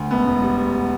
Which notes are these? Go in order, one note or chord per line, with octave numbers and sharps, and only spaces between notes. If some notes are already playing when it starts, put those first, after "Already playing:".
Already playing: D2
E1 B3
E1
G3